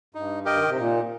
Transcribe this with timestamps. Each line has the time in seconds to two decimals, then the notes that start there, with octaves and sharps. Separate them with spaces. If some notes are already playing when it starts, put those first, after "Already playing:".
0.15 G2 D#4
0.45 G4 A#4 D#5 G5
0.55 D#3
0.66 C3
0.76 A#2 D#4